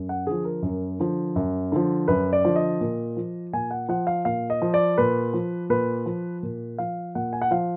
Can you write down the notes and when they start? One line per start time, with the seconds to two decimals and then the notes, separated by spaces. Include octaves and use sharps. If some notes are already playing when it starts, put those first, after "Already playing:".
Already playing: F#2
0.09 F#5
0.26 D3 F3 G#4
0.45 A#4
0.62 F#2
1.00 D3 F3
1.36 F#2
1.72 D3 F3
2.08 F#2 B4
2.33 D5
2.45 D3 F3
2.56 D#5
2.81 A#2
3.17 F3
3.53 A#2 G#5
3.71 F#5
3.89 F3 F#5
4.07 F5
4.25 A#2 F5
4.50 D#5
4.62 F3
4.74 D5
4.98 A#2 B4
5.33 F3
5.70 A#2 B4
6.06 F3
6.43 A#2
6.78 F3 F5
7.15 A#2 F#5
7.33 G#5
7.42 F#5
7.51 F3 F5